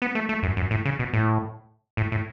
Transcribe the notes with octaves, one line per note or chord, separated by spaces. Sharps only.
B3
A3
A3
F#2
F#2
A2
C#3
B2
A2
A2
A2